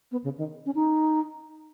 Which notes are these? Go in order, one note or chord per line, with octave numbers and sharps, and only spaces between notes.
B3
C#3
D#3
C#4
D#4